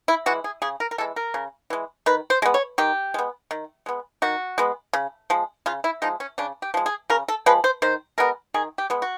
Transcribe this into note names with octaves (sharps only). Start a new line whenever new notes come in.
E4
E3 G#3 F#4
G#4
C#3 G#4
A#4
A#4
E3 G#3 A4
A#4
C#3
E3 G#3
D#3 B4
C5
G#3 B3
C#5
D#3 G4
G#3 B3
D#3
G#3 B3
D#3 F#4
G#3 B3
C#3
F3 G#3
C#3 F4
E4
F3 G#3 D#4
C#4
C#3 D4
G4
F3 G#3
G#4
C#3 A#4
A4
F3 G#3 B4
C5
D#3 C5
G#3 B3 A#4
D#3 G#4
G4
G#3 B3
F#4